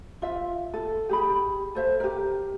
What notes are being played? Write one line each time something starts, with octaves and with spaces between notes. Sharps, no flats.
F4 E5
A4
G4 G#4 B5
A4 C5 E5
G4 A#4